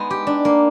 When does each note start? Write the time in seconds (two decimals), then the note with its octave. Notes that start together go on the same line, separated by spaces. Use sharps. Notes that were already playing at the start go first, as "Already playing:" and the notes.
Already playing: G#3 B3 D#4
0.10 G4
0.27 D4
0.45 A#3